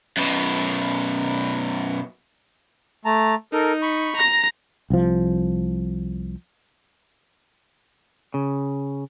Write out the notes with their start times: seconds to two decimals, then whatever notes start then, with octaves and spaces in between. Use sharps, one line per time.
0.17 F#2 B2
3.05 A3 A5 A#5
3.53 D#4 A4 A#4
3.82 B5 C#6
4.17 A#5 A#6
4.90 C2 F3
8.34 C#3